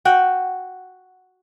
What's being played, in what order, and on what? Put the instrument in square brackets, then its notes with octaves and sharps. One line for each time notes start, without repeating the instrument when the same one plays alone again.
[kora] F#4 F#5 G5